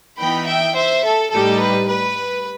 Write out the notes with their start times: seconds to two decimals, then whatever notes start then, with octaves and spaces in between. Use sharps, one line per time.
0.19 E3 B3 D#4 G5 B5
0.47 E5 G5
0.76 C5 E5
1.05 A4
1.32 A2 G3 D#4 A4
1.61 B4
1.89 B4